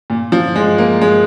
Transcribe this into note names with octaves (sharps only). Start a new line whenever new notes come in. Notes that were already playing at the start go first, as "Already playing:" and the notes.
A#2
F3
G#3
A#3
G#3